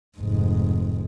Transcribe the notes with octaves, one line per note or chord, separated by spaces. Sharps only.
F1 G#2